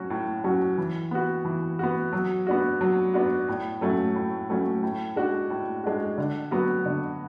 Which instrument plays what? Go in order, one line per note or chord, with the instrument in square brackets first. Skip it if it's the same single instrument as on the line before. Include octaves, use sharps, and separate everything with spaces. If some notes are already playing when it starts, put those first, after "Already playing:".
Already playing: [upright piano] F#3 C#4 F#4
A2
F#3 C#4 F#4
E3
B3 F#4
E3
B3 F#4
F#3
B3 D4 F#4
F#3
B3 D4 F#4
A2
F#3 A3 C#4
A2
F#3 A3 C#4
A2
G#3 D4 F#4
A2
G#3 D4 F#4
D3
F#3 B3 F#4
D3